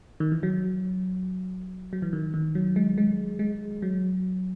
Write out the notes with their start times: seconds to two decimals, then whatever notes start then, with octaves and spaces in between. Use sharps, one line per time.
0.20 D#3
0.32 E3
0.43 F#3
1.93 F#3
2.02 E3
2.13 D#3
2.34 D#3
2.55 F#3
2.76 G#3
2.98 G#3
3.39 G#3
3.82 F#3